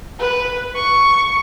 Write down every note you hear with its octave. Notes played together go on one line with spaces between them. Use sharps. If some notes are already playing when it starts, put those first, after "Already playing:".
B4
C#6